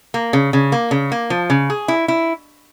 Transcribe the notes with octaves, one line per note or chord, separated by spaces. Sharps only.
A#3
C#3
C#3
A#3
C#3
A#3
F3
C#3
G#4
E4
E4